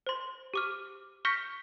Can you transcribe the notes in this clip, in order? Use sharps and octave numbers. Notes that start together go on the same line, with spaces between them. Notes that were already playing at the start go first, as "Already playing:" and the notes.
C5 C6
G4 D6 F6
C#6 F6 G6 A#6 B6 C#7